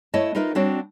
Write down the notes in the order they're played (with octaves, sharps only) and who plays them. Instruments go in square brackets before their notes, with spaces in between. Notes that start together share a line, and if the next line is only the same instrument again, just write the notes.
[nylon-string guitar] A3 E4 C#5 D#5 A5
D#4 F4 A#4 B4 D#5 E5
G3 C4 D4 F#4 C#5